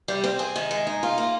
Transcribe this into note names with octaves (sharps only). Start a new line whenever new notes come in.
G3
C4
G#4
D#3
G#3
D#4
F4
A#3